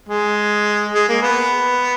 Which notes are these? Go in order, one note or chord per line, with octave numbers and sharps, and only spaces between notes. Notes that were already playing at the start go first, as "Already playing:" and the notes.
G#3
G#3
A#3
B3